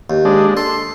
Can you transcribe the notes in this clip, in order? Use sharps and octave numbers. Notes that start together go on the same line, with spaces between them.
D#2
G#3 D4
A4 C6